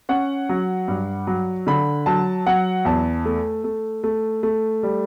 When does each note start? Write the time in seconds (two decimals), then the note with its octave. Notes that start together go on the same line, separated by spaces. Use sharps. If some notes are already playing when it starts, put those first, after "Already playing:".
0.09 C#4 F#5
0.49 F#3
0.88 G2
1.27 F#3
1.67 D3 B5
2.06 F#3 A5
2.47 F#3 F#5
2.85 E2 A5
3.25 A3
3.64 A3
4.04 A3
4.43 A3
4.83 G3